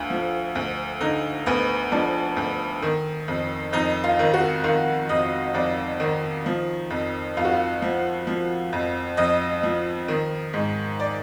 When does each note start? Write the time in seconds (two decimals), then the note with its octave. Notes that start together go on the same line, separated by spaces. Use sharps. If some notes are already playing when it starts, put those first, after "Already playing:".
Already playing: D2 D3 F4
0.10 F3
0.55 D2
1.00 D3 D#4
1.46 D2 B3
1.92 F3 D4
2.37 D2
2.82 D#3
3.28 F2
3.73 F2 D#4
4.04 F4
4.19 D#3
4.34 F#4
4.64 D#3 F4
5.09 F2 D#5
5.54 F2 D5
6.00 D#3
6.46 F3
6.90 F2
7.37 F2 F4
7.45 F#4
7.53 F4
7.82 F3
8.27 F3
8.73 F2
9.17 F2 D#5
9.63 F3
10.08 D#3
10.53 G#2
11.00 D5